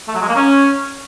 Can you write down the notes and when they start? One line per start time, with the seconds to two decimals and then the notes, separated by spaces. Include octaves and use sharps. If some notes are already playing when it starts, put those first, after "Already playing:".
0.08 A3
0.15 F#3
0.22 G#3
0.29 A#3
0.36 C#4